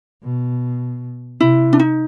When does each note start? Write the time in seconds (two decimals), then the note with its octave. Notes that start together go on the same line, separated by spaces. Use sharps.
0.23 B2
1.40 C3 E4
1.73 D4
1.79 D#4